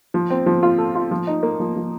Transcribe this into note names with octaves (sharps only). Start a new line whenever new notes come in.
F3
C4
F3
F4
A4
F4
F3
D#4
A#3
F3
F3